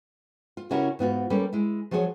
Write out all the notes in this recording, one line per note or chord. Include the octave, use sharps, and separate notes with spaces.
F4
C#3 C#4 E4 F#4 G4 A#4
G#2 B3 F4 F#4
G3 A#3 C#4 A4 B4
G#3 E4
F3 F#3 F#4 G#4 C#5